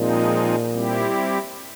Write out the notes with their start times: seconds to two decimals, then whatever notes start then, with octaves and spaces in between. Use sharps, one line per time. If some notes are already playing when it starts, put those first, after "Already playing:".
Already playing: A#2 F3 G#3 C4 D#4
0.72 G3 C4 E4 G4